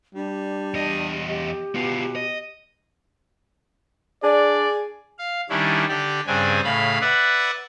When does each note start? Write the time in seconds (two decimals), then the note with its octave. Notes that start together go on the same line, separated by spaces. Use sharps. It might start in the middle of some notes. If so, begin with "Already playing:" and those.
0.15 G3 D4
0.74 E2 D#5
1.28 G4
1.75 B2 B3 F4
2.16 D#5
4.23 D4 G#4 D5
5.18 F5
5.50 D#3 G3 C#4 D4 E4
5.88 D3 G4 D5
6.27 G2 C#3 C4 D4 G#5
6.64 A2 C#3 F5 B5
7.01 B4 D5 E5 F#5